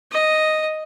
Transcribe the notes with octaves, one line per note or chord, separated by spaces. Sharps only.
D#5